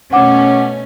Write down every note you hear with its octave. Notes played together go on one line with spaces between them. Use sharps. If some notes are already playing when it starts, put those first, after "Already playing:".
B2 A3 C#4 F#5 D6